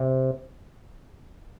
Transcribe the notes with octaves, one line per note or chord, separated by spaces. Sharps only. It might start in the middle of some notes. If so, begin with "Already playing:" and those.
Already playing: C3